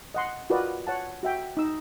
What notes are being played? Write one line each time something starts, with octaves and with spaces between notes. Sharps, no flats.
D#5 F#5 C6
F4 F#4 A#4 B4 D5 D#5
C#5 F#5 A5
F#4 E5 G5
D#4 E6